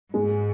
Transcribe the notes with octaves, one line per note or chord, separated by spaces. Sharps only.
G#2 G#3